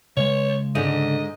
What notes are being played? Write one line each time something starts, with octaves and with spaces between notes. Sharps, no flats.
C#3 G#3 C#5
G#2 D3 D#5